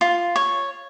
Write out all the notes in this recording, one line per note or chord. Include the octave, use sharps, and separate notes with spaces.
F4
C#5